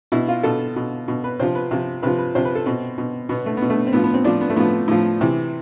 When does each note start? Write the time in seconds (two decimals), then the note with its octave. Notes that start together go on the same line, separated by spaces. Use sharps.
0.12 B2 E4
0.29 F4
0.43 B2 A4
0.76 B2
1.08 B2
1.24 B4
1.40 C3 F3 C5
1.55 B4
1.71 C3 F3
2.03 C3 F3 B4
2.18 B4
2.35 C3 F3 C5
2.45 B4
2.55 A4
2.66 B2 C4
2.98 B2
3.29 B2 B3
3.46 A3
3.57 B3
3.62 B2
3.70 A3
3.87 C4
3.93 A2 F3 B3
4.04 B3
4.14 C4
4.24 A2 F3 D4
4.41 B3
4.50 A3
4.57 A2 F3 B3
4.88 A2 F3
5.21 C3 E3